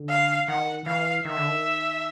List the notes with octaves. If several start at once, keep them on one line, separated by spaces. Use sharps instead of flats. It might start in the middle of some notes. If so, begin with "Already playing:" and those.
Already playing: D3
F5
D#3 F#5
E3 F5
D#3 E5
D3
D#3